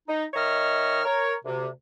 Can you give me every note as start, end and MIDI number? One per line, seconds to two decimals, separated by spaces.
0.08 0.24 63
0.34 1.01 51
0.34 1.01 73
0.34 1.01 75
0.34 1.01 76
0.34 1.01 89
1.05 1.33 70
1.05 1.33 73
1.45 1.67 38
1.45 1.67 48